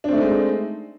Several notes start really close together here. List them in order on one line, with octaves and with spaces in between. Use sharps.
D4 C4 A3 D#4 G#3